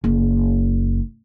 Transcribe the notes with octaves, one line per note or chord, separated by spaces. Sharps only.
F#1